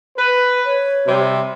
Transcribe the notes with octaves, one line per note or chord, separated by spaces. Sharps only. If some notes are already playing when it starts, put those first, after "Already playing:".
B4
C#5
C3 G3